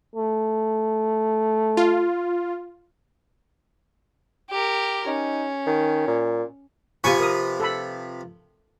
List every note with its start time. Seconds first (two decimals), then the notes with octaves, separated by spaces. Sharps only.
0.16 A3
1.77 F4
4.50 G4 A#4
5.08 C#4 D#4
5.66 D#3
6.07 A#2
7.04 C3 F3 F4 B4 G#5 C#6
7.20 A#4 D#6
7.60 A4 B5